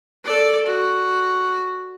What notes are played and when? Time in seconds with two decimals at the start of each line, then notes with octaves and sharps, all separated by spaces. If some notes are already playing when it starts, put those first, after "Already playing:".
0.24 A4 D5
0.66 F#4